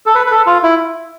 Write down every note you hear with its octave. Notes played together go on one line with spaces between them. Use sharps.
A4
B4
B4
A4
F4
E4